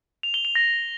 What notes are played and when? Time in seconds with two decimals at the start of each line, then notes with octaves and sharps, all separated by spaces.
0.23 F7
0.34 G7
0.45 F7
0.55 A#6